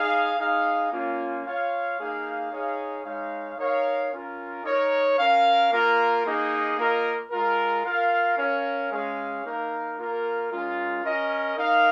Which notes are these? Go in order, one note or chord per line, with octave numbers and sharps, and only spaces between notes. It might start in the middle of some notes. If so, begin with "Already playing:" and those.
Already playing: D#4 G#4 F5
D#4 G#4 F5
A#3 C#4 F4
F4 C#5 F5
A#3 D#4 G#4 F5
D#4 G#4 C#5 F5
G#3 D#4 C#5 F5
D#4 A#4 C#5 F5
C#4 F4 A#4
D#4 A#4 C#5
C#4 A#4 F5
A#3 F4 A#4
A#3 D#4 G#4 D#5
A#3 F4 A#4 D#5
G#3 F4 A#4
F4 A#4 F5
C#4 A#4 C#5 F5
G#3 C#4 G#4 C#5 F5
A#3 D#4 A#4 F5
A#3 F4 A#4
G#3 C#4 F4 A#4
C#4 A#4 D#5
D#4 A#4 F5